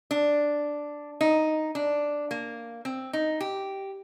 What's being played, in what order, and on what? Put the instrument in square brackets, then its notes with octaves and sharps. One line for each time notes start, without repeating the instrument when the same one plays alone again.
[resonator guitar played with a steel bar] D4
D#4
D4
A#3
C4
D#4
G4